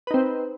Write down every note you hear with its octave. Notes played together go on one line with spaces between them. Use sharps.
C4 D#4 B4